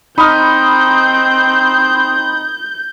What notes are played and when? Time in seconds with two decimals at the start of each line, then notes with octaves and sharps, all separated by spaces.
0.18 C4 D#4 B5 D#6 F6 G6